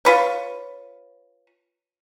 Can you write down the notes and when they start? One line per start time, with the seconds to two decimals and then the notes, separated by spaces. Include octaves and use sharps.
0.05 F4 B4 C#5